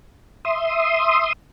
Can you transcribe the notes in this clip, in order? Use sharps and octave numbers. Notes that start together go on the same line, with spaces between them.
E5 C6 D#6